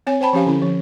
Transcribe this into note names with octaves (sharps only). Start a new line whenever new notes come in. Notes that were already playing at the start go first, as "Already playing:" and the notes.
C4 C#5 G#5
C5 G5 A5 B5
F3 C#4 G4 F5 G#5
D3 C#4 E4
F3